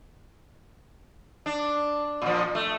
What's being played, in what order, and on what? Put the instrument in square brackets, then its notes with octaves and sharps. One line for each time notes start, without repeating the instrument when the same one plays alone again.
[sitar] D4
A#2 F3
A3